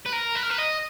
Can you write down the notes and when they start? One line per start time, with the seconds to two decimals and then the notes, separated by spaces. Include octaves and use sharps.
0.06 B4
0.13 A#4
0.35 B4
0.43 A#4
0.50 B4
0.59 D#5